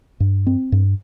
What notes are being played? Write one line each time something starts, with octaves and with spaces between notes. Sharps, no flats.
G2
C4
G2